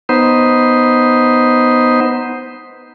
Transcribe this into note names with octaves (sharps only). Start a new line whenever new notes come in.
B3 D#4 C5